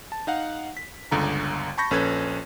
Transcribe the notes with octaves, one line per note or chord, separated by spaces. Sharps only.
A5
D#4 F5 F#5
B6
G1 C#2 D3 A#5
A5 B5 C#6 G6 A#6
A#1 C#4 A4 B4 G#6